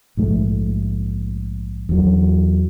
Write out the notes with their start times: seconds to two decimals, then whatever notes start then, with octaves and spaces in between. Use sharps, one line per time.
0.17 A#1 G#2 A3
1.89 E2 F#3